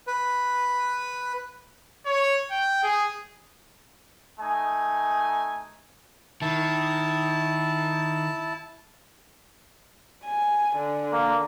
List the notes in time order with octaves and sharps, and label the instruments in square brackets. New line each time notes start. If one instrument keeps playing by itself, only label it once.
[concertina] B4
[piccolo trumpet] C#5
G5
G#4
[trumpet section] A3 D#4 G#5
[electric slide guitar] D#3 [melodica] E4 A5
[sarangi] G#5
D3
[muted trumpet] A#3